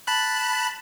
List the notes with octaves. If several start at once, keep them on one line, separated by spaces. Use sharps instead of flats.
A5 B5 F#6